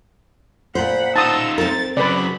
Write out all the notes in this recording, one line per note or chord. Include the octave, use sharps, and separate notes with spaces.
A#2 C5 F#5 B5
D#4 F4 A5 D#6 E6
C4 A#4 A6
C#3 F#3 B4 D5 B5